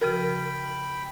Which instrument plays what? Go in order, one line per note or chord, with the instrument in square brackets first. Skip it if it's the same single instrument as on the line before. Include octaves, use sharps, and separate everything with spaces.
[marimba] C#3 F3 F#4 [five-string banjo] A#4 [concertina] G5 B5